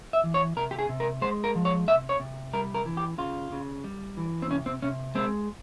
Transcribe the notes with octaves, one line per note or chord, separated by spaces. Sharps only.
E5
E3
C#5
C3 A#4
G4
G#4
C3
A#4
G#3 C5
A#4
F3
C#5
C3 E5
C#5
C3
G3 A#4
A#4
E3
G4
C#3 F4
C#3
G3
E3
C4
C3 C#4
C4
C3 C#4
G#3 C4